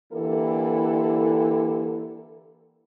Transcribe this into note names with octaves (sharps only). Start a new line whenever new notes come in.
D3 E3 A#3 E4 G4 A4